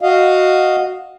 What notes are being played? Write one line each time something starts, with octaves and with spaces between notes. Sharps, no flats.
F#4 D#5 F5